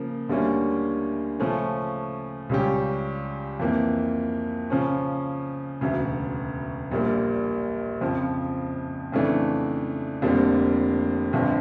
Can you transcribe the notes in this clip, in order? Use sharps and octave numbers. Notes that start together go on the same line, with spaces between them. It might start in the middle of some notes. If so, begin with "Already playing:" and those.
Already playing: C#3 F3 A#3
D2 D3 G3 A#3 C#4
C#3 F3 A3 C#4
C#2 C#3 G3 C#4 G4
F2 E3 A#3
C#3 F3 C#4
E1 D2 C#3
A#1 A#2 G3 A#3
F2 C#3 F3
F2 C#3 E3 A3 D4
F1 F2 D3 G3 A#3
G1 F2 D3